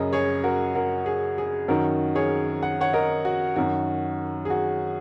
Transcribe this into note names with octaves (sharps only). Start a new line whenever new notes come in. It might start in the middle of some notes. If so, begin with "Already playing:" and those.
Already playing: F#2 C#3 A#4 D#5
G#4 C#5
F#4 A#4
F#4 A#4
G#4
G#4
F#2 D#3 F#4 A#4
G#4 C#5
F#5
C#5 F#5
A#4 D#5
F#4
F#2 D#3 F#4
G#4
F#4